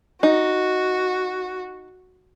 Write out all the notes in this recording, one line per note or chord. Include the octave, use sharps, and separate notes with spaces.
D#4 F#4